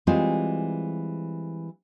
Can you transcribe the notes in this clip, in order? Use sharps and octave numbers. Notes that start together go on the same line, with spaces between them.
E3 G3 G#3 C4 F4